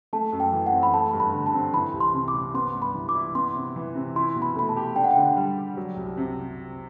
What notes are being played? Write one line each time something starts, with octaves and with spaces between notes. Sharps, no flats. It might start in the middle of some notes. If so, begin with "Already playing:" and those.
A3 A5
F#2
G5
E3
F#5
C4
B5
A3 A5
G2
B5
D3
A5
C4
E3 B5
C2
C6
C3
D6
C2
B3 C6
G2
B5
E3
D6
E4
B3 C6
C3
E3
C3
E4 C6
B2
B5
A3 B5
A5
G4
D4 G5
F#5
D3 G5
G3
G4
F#3
C2
C3